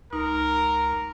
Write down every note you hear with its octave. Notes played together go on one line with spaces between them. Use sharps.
C#2 D#4 A#4